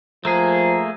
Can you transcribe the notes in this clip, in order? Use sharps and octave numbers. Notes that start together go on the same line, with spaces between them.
F3 A3 A#3 G#4 A#5